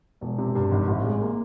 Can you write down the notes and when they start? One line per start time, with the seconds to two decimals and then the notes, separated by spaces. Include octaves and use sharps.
0.21 E1
0.38 C3
0.55 G2
0.71 G#1
0.88 A1
1.04 G#3
1.21 A#3